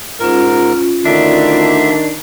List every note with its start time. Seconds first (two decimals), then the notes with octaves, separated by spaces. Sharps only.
0.20 G#2 C#4 F4 A#4
1.05 D2 D3 D#3 D4 E5